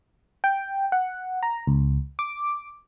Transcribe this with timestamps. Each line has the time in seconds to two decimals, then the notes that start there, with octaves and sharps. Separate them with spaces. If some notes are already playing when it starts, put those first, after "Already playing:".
0.44 G5
0.92 F#5
1.43 A#5
1.67 C#2
2.19 D6